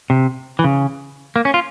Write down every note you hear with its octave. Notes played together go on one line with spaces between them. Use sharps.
C3
E3
C#3
A#3
C#4
F4